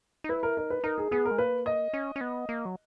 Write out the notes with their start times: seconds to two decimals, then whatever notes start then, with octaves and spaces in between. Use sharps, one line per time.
0.24 D#4
0.29 E4 B4
0.43 A#4
0.57 D#4 A#4
0.70 B4
0.84 D#4 A#4
0.98 G#4
1.11 B3 G#4
1.25 A#4
1.31 G#3
1.38 A#3 B4
1.66 D#5
1.93 C#4
2.16 C#4
2.21 B3
2.49 A#3
2.65 F#3